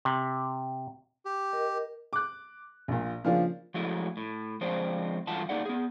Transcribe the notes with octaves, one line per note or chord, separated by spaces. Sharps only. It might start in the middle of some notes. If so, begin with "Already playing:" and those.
C3
G4
A#4 D#5
D6 F#6
A#1 A#2
C#3 F3 A#3 C#4 D4 F4
F3 F#3 G#3 A3 E4
A2
F3 G#3 C4 D4 C5
G2 E3 A3 F4 F#5 A5
A#3 D4 D#4 G#4 D5 F#5
B3 G#4